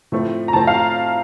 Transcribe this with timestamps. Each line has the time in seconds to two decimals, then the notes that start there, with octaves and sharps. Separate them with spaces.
0.12 A2 F3 A3 C4
0.48 A#5
0.53 A2 F3 A3 C4 A5
0.67 F5